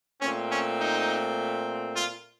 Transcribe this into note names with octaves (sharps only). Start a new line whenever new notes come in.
A#2 A3 C4 C#4
C#4
D#4
F4